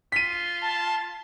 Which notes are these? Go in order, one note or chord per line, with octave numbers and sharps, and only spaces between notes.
F4 B6 D#7
A5